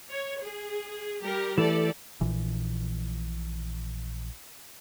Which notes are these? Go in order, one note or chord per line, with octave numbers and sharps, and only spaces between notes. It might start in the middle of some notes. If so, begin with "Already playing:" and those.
C#5
G#4
G3 G4 A#4
E3 A3 G4 A4 D5
A#1 A#2 E3